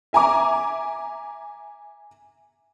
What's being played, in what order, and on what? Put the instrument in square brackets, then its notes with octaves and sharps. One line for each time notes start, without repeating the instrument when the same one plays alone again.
[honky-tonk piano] E5 G#5 A#5 D6